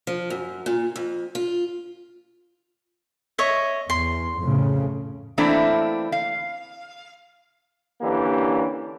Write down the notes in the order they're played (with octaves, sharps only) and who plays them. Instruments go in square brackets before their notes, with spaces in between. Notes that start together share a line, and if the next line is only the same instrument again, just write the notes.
[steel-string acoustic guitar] F3
F#2
A#2
F2
F4
[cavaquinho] C#5 D#5 E5
[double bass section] E2 [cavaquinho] C6
[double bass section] F2 A2 C#3
[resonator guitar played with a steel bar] E3 A3 A#3 C4 D4 E4
F5
[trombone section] D3 E3 A#3 C#4 D4 G4